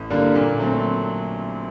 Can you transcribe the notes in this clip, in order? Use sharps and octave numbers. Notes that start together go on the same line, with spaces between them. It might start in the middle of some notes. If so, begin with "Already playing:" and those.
Already playing: A1
G2 D3 G3 A#3
A#2
F#3 A3 C4